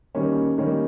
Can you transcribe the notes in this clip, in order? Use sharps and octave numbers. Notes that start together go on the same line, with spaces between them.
D#3 G3 A#3 C#4
D#3 G3 A#3 C#4